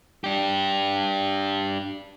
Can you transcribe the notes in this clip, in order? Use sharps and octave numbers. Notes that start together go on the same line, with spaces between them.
D4 G4